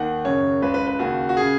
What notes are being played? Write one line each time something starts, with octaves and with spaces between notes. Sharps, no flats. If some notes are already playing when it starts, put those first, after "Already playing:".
Already playing: D#2 D#3 F#5
F#2 C#3 C#5
C#2 C#3 B4
B4
B4
D#2 C#3 F#4
F#4
C#3 G#4